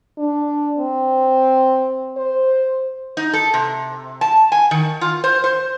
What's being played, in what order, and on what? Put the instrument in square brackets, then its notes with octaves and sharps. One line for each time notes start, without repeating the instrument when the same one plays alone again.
[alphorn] D4
C4
C5
[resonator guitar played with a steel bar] D#4
A4
C3
A5
G#5
D#3
F4
C5
C5